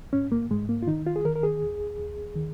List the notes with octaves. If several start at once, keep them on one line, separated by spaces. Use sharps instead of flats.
G#2 C#4
A#3
G#2 G#3
A#3
F4
D#3 D#4
F4
G#4
D#3 A#4
A#4
G#4
D#2
D#2
D#3